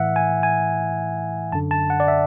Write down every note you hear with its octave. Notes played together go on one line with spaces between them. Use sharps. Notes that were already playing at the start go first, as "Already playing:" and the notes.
Already playing: A2 E3 E5 F#5
G#5
G#5
F#2 D3 A5
A5
F#5
D5
E5